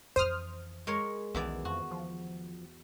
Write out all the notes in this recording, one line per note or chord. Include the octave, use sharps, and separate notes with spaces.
F2 E3 C5 D#6 F6
G#3 A#4 C#5
B1 E2 D#3 E3 G#3 D5
F2 F#4
F3